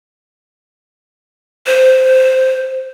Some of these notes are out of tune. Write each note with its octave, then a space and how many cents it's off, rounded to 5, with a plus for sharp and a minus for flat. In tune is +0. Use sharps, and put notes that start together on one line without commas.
C5 -10